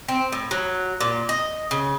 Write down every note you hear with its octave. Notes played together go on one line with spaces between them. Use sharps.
C4
A2
F#3
A#2
D#5
C#3